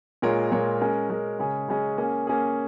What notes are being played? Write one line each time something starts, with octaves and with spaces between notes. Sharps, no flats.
A#2 G#3 F4 A#4 C#5
A#2 G#3 F4 A#4 C#5
G#3 C#4 A#4
G#3 C#4 A#4
C#3 G#3 C#4 G#4
C#3 G#3 C#4 G#4
A#3 C#4 G#4
A#3 C#4 G#4